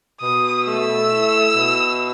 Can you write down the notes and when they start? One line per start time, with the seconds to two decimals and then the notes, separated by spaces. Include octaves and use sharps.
0.20 B2 D#6
0.65 A3 E6
1.10 E4
1.55 B2